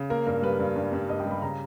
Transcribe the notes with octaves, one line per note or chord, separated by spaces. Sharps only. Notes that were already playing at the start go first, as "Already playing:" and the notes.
Already playing: C#3
A#3 A#4
G2 A#4
G3 B4
G2
G2
G2
G2 D#5
G5
G3
B5
C#3 A#5